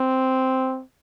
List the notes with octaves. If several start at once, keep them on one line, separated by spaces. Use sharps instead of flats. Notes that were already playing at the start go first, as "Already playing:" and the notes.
Already playing: C4